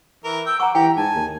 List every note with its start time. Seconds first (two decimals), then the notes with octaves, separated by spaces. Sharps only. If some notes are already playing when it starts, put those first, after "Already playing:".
0.24 E3 A#4
0.46 G5 E6
0.60 F#5 A#5 C#6 D6
0.75 E3 G4 G5 A#5
0.97 G#2 G#5 A5
1.15 D#2